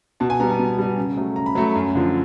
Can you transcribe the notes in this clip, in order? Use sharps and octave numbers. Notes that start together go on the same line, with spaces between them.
B2 A5
G#5
G3 B3 A#5
A5
B2
G3 B3
C#3
F#3 A3
C#3 A#5
B5
F#3 A3 A#5
F#2
D3 F3